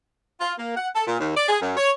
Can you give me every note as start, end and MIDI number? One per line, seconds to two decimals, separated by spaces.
0.40 0.52 65
0.57 0.76 58
0.76 0.87 78
0.94 1.03 69
1.06 1.17 46
1.19 1.35 39
1.35 1.46 74
1.49 1.59 68
1.60 1.75 42
1.76 1.90 73